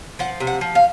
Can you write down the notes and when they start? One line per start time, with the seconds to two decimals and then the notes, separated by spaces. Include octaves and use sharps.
0.19 F3 F#5
0.40 C3
0.47 F#5
0.61 F3
0.75 F5